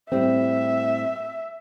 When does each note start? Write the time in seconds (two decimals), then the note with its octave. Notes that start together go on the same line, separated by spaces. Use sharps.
0.11 A2 G3 C4 E5